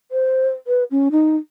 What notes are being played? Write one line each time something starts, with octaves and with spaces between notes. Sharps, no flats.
C5
B4
C#4
D#4